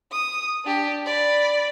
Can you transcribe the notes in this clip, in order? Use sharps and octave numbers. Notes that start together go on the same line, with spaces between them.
D#6
D4 G4
D5 B5